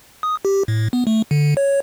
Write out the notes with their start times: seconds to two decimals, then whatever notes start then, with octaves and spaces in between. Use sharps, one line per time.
0.23 D#6
0.45 G4
0.68 A2
0.93 B3
1.07 A3
1.31 D3
1.57 C#5